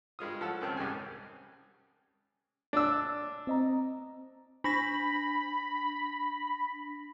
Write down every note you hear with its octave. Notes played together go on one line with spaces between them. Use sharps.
G2 G#3 F4 D#6
F3 A4 C#5 F#5 E6
C#2 F#2 D#3 C4 A5 F#6
C2 G#2 C#3 G4 G#5
D4 E6
C4 D#5 A#5
D4 B5 A#6 B6